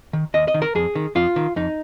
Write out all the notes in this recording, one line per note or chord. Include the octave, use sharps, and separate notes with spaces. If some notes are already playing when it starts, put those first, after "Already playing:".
D#3
D#2 D#5
D#5
D#3
A#4
F2 G#4
D#3
F2 F4
D#3
F2 D#4